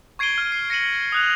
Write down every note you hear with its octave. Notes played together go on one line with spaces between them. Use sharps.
C#6 G#6 C7 D7 D#7 G7
F6
C7
A#6 C#7 D#7 F#7
D#6 F#6 F7